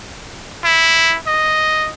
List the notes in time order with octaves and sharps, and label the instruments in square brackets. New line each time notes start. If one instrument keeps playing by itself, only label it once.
[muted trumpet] E4
D#5